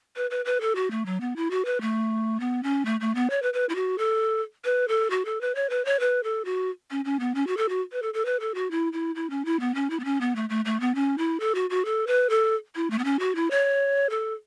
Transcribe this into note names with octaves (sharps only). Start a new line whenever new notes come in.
B4
B4
B4
A4
F#4
A3
F#3
B3
E4
F#4
B4
A3
B3
C#4
A3
A3
B3
C#5
B4
B4
E4
F#4
A4
B4
A4
F#4
A4
B4
C#5
B4
C#5
B4
A4
F#4
C#4
C#4
B3
C#4
F#4
A4
F#4
B4
A4
A4
B4
A4
F#4
E4
E4
E4
C#4
E4
B3
C#4
E4
B3
C#4
B3
A3
A3
A3
B3
C#4
E4
A4
F#4
F#4
A4
B4
A4
E4
A3
B3
C#4
F#4
E4
C#5
A4